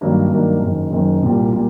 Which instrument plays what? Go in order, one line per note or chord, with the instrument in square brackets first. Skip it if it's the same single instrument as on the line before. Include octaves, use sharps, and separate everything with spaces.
[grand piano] G2 D#3 F#3 A#3 D4
G2 D#3 F#3 A#3 D4
F#1 F#2 D#3
F#1 F#2 D#3
C2 A#2 G3
A#2 G3